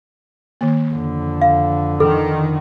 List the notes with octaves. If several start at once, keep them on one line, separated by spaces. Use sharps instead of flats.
D#3 A#3
F2 D3
F5
D#3 A4